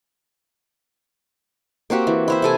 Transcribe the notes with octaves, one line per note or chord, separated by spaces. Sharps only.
A#3 C4 F#4 G4
E3
E4 C5 E5
C3 A4 G#5